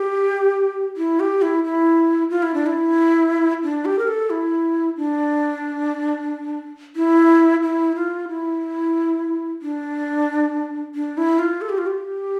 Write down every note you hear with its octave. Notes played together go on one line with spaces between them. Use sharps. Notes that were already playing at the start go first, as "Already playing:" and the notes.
Already playing: G4
E4
G4
E4
E4
F4
E4
D4
E4
D4
G4
A#4
A4
E4
D4
E4
E4
F4
E4
D4
D4
E4
F4
A4
G4
F4
G4